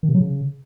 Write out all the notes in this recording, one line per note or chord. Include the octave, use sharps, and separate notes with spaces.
D#3
C3
F#3
C#3